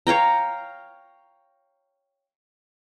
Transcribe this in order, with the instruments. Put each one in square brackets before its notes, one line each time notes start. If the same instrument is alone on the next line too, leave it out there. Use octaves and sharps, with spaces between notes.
[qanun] C#5 F5 G5 A#5